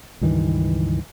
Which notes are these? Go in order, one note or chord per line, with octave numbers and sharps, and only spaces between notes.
C#2 G2 D#3 E3